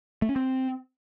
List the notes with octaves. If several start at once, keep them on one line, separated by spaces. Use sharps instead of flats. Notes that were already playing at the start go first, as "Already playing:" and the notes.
A3
C#4
C4